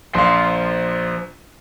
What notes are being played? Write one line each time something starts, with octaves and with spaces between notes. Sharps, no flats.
A#1 F3 F5 C6